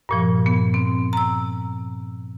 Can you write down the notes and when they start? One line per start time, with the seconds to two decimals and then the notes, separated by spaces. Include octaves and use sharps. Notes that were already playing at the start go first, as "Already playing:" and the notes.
0.09 G2 A#2 F3
0.46 B3
0.74 C4
1.13 A#5 E6